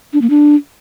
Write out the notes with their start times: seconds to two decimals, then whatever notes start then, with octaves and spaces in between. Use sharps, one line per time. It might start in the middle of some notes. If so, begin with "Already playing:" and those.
0.13 D4
0.22 A#3
0.30 D4